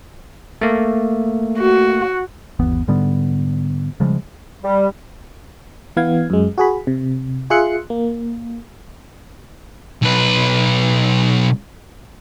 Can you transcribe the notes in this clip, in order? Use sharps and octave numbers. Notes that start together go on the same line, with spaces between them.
A3 A#3
F#4
G1 D#2 E3 B3
G#2 D3 G3 B3
C#3 F3 G3 G#3
G3
E3 B3 F5 G#6
F#2 G#3
F#4 G#4 B5
C3
F4 G#4 E5 C6 F#6 C#7
A#3
B1 B4